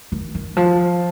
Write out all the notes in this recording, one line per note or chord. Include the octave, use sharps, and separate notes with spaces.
D#3
D#3
F3